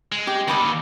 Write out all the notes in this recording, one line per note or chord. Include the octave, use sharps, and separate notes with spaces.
G#3
G4
D#2 D3 B5 D6 D#6